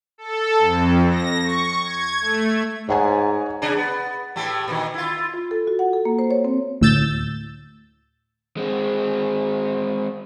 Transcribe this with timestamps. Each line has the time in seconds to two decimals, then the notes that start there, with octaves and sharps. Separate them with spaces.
0.18 A4
0.58 F2
1.10 A#6
1.44 C#6
1.84 G#6
2.21 A3
2.89 G#2 C#5 F#5 G#5
3.62 C3 D4 G#4
3.77 B3
4.36 A2 A3 G4
4.68 A#2 D#3
4.94 E4 F4
5.34 F4
5.51 A4
5.67 F#4
5.79 F#5
5.93 A4
6.05 A#3
6.19 C5
6.31 C#5
6.45 C4
6.81 D2 A2 E6 G6 A6
8.57 G#3 C4